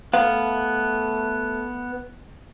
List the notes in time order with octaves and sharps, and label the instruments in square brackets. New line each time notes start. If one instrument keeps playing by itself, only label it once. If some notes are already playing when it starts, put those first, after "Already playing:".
[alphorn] A3 [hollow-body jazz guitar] B3 F5